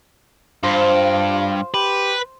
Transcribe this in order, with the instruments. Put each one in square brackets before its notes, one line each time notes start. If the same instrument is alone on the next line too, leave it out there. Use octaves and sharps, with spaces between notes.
[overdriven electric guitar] G2 [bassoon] F4 [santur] C5
[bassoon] G4 [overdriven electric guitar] B4